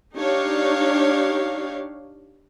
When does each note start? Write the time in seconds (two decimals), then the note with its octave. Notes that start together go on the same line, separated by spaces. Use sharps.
0.15 D4 D#4 G4 C#5 F5